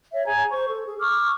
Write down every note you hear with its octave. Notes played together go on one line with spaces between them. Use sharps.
C#5 E5
G#4 G#5 A#5 G#6
C5 C#6
A4
G#4
C#6 D6 E6 F6